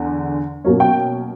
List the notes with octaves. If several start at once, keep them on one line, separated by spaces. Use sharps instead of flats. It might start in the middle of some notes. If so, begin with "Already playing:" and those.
Already playing: E2 D3
B2 F#3 A#3 C#4
G5